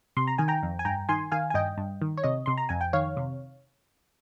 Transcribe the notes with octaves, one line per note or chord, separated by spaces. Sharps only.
C3 C6
A#5
D#3 G#5
G5 A#5
F2
G#5
G2 G5 A#5
D#3 G#5 C6
D#3 F5 G#5
G#5
G2 D#5 G5
G2
D#3
C#5
C3 D#5
C3 C6
A#5
F2 G#5
G5
D#3 C#5 F5
C3